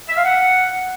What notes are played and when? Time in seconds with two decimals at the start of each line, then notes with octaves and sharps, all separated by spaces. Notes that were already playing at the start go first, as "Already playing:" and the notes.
0.09 E5
0.17 F5
0.25 F#5